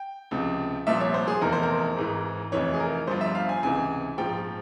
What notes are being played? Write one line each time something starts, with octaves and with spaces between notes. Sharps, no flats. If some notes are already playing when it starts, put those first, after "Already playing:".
Already playing: G5
C#2 C3 F3
C2 A#2 F3 E5
C#5
C5
G#4
F1 E2 E3 A#4
C5
A#4
G#1 G#2 E3
F1 F2 E3 C#5
G#4
A#4
G1 G2 F3 C5
E5
F5
G#5
C#2 C3 E3 G#5
A#1 G#2 F3 G5